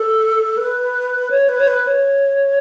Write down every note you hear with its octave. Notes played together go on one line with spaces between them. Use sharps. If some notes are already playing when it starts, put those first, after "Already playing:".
Already playing: A4
B4
C#5
B4
C#5
B4
C#5